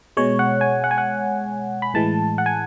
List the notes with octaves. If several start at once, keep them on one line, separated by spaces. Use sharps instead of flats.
B2 G#3 C#5
F#5
G#5
F#5
G#5
F#5
B5
A2 E3 G#3 A5
F#5
G#5